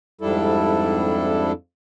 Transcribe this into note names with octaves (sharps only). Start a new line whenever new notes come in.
F2 G#2 G3 D4 E4 A4